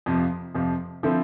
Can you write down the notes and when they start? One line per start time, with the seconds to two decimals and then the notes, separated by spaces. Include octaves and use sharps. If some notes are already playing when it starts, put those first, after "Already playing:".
0.06 F2 C3 F3
0.55 F2 C3 F3
1.03 D3 F3 C4 E4 A4